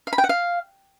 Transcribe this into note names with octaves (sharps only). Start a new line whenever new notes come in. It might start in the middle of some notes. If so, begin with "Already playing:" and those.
F5
B5
G5
F#5
F5